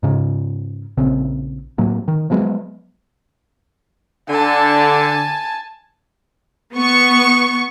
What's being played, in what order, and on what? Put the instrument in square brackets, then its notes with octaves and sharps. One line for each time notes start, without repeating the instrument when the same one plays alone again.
[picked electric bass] G#2 C#3
A#1 C#3 C4
A2 F#3 A#3
D#3
F3 F#3 G#3 B3
[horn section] D3 [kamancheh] G#5 A5
[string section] B3 C#6